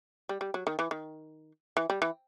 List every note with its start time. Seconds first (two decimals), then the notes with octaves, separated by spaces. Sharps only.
0.29 G3
0.41 G3
0.54 F#3
0.67 D#3
0.79 E3
0.91 D#3
1.77 E3
1.90 G3
2.02 E3